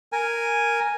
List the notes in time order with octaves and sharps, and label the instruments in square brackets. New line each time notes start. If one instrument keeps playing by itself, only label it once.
[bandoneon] A#4 G#5